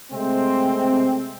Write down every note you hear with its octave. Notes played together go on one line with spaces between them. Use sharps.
C3 G#3 A3 C4